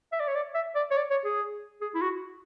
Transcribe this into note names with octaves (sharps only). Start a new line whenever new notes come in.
E5
D5
C#5
D5
E5
D5
C#5
D5
C#5
G#4
G#4
E4
F#4